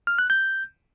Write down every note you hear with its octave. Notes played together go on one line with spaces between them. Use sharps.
F6
F#6
G6